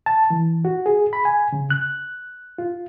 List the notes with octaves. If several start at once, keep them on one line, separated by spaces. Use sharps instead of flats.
A5
E3
F#4
G#4
B5
G#5
C#3
F#6
F4